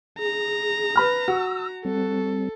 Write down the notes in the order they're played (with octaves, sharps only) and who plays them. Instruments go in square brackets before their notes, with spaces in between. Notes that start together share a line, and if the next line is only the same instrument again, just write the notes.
[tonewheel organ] G#4 [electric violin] A#5
[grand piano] B4 B5 F6
[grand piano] F#4 [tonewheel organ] E6
[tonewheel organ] G3 C4 [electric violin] A4